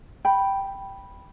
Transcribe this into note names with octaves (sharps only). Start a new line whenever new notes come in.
G5 B5